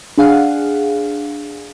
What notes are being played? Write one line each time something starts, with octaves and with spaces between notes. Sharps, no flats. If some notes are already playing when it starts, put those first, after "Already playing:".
D4 G#4 F5 F#5